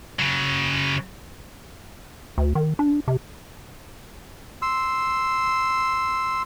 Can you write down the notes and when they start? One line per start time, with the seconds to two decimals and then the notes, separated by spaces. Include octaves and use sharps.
0.19 C#3 F#3
2.38 D2
2.55 D#3
2.79 D4
3.08 C3
4.62 C6 E6